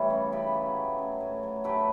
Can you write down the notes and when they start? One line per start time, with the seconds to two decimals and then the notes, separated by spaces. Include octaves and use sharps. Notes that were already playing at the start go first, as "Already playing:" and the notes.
Already playing: E3 G3 A3 A4 C#5
0.10 C#3
0.32 C#3 G4 B4
0.54 F#3
0.76 A3
0.98 C#3
1.20 A2
1.43 F#3
1.64 A3 G4 B4